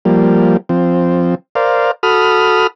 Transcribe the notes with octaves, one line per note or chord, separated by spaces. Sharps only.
F3 G3 A#3
F3 C4
A#4 C5 D5 F5
F#4 A4 B5 D#6 F6